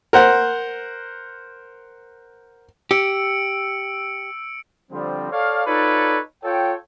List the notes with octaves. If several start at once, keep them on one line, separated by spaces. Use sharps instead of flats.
A#4 C5 F#5
G4 E6 C#7 D7
D3 F3 G3 C4
A4 C#5 D5 F5
D#4 F4 A4 B4 C#5 D5
F4 A4 C#5 G5